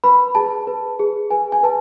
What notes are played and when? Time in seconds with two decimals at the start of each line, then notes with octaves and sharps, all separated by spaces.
0.04 B4 B5
0.35 G#4 A5
0.67 B4
0.99 G#4
1.30 B4 G#5
1.52 G#5
1.63 B4 A5